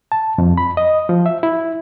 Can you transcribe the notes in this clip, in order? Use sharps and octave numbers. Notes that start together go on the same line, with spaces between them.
A5
F2
B5
D#5
F3
E5
E4